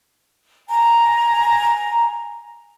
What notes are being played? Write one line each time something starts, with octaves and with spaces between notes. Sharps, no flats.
G#5 A#5